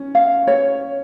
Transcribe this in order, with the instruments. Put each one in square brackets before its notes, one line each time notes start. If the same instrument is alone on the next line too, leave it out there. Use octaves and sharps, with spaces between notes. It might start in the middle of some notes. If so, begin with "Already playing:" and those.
Already playing: [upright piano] C#4
[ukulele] F5
C#5